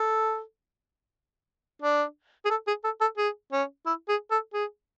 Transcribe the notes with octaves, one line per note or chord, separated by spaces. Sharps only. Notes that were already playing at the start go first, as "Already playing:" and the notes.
Already playing: A4
D4
G#4
A4
G#4
A4
A4
G#4
C#4
E4
G#4
A4
G#4